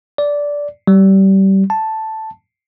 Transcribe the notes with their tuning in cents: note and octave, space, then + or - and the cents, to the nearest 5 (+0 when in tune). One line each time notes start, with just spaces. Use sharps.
D5 -10
G3 -25
A5 +0